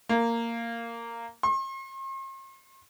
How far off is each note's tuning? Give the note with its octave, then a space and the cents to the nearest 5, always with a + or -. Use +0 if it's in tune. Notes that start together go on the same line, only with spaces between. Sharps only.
A#3 -10
C6 +45